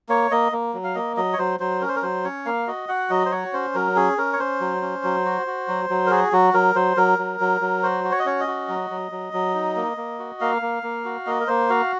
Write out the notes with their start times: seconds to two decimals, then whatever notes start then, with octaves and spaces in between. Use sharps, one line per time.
0.09 A#3 C#5
0.31 A#3 D#5
0.52 A#3
0.74 F#3
0.84 F5
0.95 A#3 D#5
1.17 F#3 D#5
1.33 C#5
1.38 F#3 C5
1.60 F#3 C5
1.81 C#4 A#4
1.88 C5
1.96 A#4
2.03 F#3 C5
2.24 C#4 C#5
2.46 A#3 F5
2.67 F#4 D#5
2.88 F#4 F#5
3.10 F#3 D#5
3.26 C5
3.32 F#4 C#5
3.53 C#4 C5
3.74 F#3 A#4
3.96 C#4 G#4
4.18 C#4 A#4
4.33 C#5
4.39 C#4 C5
4.61 F#3
4.82 C#4
5.04 F#3
5.25 F#4
5.47 F#4
5.68 F#3
5.90 F#3
6.07 A#4
6.11 F#4 G#4
6.32 F#3 F#4
6.54 F#3 A#4
6.75 F#3 C5
6.97 F#3 A#4
7.19 F#3
7.40 F#3
7.61 F#3
7.83 F#4 C5
8.04 F#4
8.12 C#5
8.19 D#5
8.26 C#4 C#5
8.40 D#5
8.47 F#4
8.68 F#3
8.90 F#3
9.12 F#3
9.33 F#3
9.54 D#4
9.76 A#3
9.97 A#3
10.19 F#4
10.41 A#3 F5
10.62 A#3
10.83 A#3
11.05 F#4
11.27 A#3 D#5
11.40 A#4
11.47 A#3 C5
11.69 F#4 F5